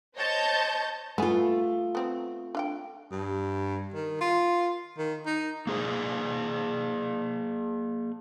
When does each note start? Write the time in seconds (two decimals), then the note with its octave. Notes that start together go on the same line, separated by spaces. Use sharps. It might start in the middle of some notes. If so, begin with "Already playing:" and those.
0.17 C5 C#5 D#5 A5 G6
1.18 A3 B3 F4 G#4
1.95 B3 C4 C5
2.55 D4 F5 G5
3.12 G2
3.94 D#3
4.21 F4
4.98 D#3
5.26 D#4
5.67 A#3 G#4 C5